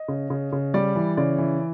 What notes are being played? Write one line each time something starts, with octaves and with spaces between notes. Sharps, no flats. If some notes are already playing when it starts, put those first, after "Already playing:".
Already playing: D#5
C#3
C#3
C#3
G3 D5
E3
C#3 D5
E3